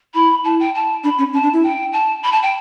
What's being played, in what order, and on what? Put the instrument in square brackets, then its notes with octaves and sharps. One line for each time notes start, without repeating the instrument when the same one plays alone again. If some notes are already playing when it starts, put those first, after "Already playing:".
[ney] E4 [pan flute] B5
[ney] E4 [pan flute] A5
[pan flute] G5
A5
[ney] D4 [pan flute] B5
[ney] C#4
[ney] C#4 [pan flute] A5
[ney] D4
E4
[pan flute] G5
A5
B5
A5
G5